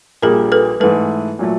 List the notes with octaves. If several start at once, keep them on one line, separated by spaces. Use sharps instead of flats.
A#1 A#2 G3 A#3 G#4 A#4
A4 B4
G#2 E3 A3 A4 B4
A#2 F#3 A3